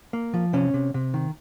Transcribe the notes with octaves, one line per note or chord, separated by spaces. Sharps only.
A#3
F3
C3 C#4
C3
C3
D#3